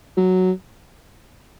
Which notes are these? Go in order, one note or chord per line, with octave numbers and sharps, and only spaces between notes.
F#3